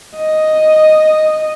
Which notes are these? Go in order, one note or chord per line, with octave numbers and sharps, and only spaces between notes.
D#5